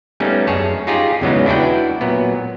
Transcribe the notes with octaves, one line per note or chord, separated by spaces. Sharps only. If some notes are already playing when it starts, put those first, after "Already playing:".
G3 A3 B3 C#4 D#4
F#2 G#4 C#5 A5
D#4 F4 G4 G#4
E2 C#3 F#3 G#3 B3 D#4
D4 E4 F#4 B4 D5 G5
A#2 F#3 B3